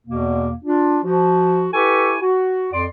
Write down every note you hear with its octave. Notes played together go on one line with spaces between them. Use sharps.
E2 B2 A#3
D4 F4
F3 F#4
E4 G4 A4 B4 G#5 C#6
F#4
F2 D5 C6